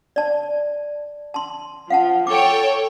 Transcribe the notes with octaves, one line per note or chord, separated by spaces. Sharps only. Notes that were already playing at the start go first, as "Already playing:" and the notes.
D5 A5
A5 C6
F3 F5 F#5 A5
A4 C#5 G5 D6